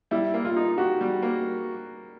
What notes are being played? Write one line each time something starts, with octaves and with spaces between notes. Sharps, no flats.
G3 E4
A#3
F4
D#4
F#4 G4
G3
A#3